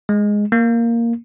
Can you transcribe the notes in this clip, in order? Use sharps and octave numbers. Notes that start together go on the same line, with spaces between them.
G#3
A#3